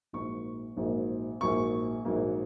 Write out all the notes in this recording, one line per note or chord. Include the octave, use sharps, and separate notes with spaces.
A#1 G#2 F#3 A#3 C#6
A#1 G#2 F#3 A#3
A#1 G#2 F#3 A#3 C#6
A#1 G#2 F#3 A#3